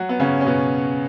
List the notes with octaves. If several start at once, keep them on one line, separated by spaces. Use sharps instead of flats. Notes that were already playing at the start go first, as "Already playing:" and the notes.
Already playing: F#3 F#4
B3
C#3 C#4
C#4
B2 B3